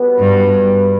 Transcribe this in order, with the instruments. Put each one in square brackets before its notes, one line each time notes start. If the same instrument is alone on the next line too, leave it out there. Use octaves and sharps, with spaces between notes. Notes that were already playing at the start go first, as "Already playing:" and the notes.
Already playing: [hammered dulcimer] B2 G3 B3
[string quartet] G2